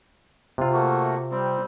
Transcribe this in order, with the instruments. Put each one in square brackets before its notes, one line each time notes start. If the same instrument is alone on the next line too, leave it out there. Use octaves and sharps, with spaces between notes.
[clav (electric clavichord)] C3 F4
[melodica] A3 A#3 F#4
G3 C4